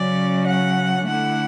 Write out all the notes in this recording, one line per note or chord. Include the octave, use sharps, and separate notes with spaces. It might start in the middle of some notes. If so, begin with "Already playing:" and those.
Already playing: C#3 F#3 C#4 D5
F#5
D3 A3 E4 F#5